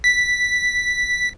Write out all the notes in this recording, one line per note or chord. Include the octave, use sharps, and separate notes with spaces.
B6